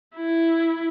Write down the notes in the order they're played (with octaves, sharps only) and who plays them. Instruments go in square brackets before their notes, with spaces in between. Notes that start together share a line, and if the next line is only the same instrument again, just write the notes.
[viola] E4